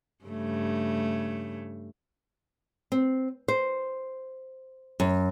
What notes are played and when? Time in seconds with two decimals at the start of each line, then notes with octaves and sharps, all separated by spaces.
0.25 G2 C#3 A3
2.92 C4
3.48 C5
5.00 F#2